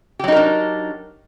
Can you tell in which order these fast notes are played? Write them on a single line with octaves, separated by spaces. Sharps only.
G4 F#3 D#4 A#4 D4